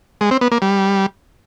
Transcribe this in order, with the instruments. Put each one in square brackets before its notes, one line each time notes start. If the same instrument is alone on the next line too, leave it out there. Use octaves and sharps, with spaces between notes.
[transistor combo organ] G#3
C4
B3
A#3
G3